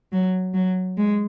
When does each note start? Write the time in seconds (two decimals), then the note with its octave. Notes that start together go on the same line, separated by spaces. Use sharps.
0.13 F#3
0.54 F#3
0.97 G#3